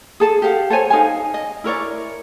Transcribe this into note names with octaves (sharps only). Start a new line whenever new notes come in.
G#4 A4 A5
G4 F5 F#5
A4 C5 C#5 G#5
D#4 F5 G#5
D#5
E4 A#4 C#5 D5